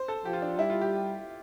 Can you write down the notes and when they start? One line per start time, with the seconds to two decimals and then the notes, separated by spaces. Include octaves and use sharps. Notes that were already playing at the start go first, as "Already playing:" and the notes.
Already playing: C5
0.08 A4
0.25 F3 G4
0.33 F4
0.42 D4
0.58 G3 E4
0.70 F4
0.81 G4